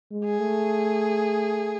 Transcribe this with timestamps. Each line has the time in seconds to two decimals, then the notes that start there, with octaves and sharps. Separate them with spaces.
0.11 G#3
0.25 G#4
0.39 A3